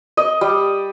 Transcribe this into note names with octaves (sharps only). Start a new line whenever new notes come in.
D#5
G3